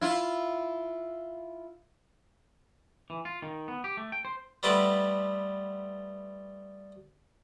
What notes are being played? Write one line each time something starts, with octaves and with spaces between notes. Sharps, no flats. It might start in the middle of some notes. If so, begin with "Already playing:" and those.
E4 F4
E3
F4
D#3
B3
G4
A3
G5
C5
G3 A3 B3 C4 A4 D5